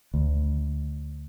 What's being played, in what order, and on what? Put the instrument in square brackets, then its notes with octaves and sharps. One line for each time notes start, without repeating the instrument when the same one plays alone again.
[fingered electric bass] D2